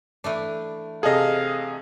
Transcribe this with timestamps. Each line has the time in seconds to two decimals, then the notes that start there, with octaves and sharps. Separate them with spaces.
0.24 E3 A3 D4
1.03 C3 G#4 A4 D#5 F5